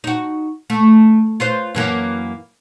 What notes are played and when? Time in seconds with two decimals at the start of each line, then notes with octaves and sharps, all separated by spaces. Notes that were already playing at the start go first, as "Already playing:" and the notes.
0.04 D#4 F#4
0.70 A3
1.40 F4 B4 C5
1.75 F#2 E3 A#3